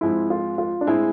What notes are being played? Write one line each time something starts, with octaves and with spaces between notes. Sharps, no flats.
G#2 F3 G#3 C4 E4
F4
F4
D4
A2 G#3 C4 E4 G#4